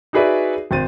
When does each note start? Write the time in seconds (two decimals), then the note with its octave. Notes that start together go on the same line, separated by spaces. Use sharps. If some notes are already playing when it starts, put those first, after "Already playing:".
0.13 D#4 F#4 G#4 B4 D5 E5
0.71 G#1 C5 A6 D#7